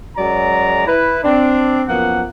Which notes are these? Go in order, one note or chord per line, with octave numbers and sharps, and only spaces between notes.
F#2 F#3 G#3 D5 A#5
E4 B4
C4 D4
F#2 F3 A#3 B3 F#5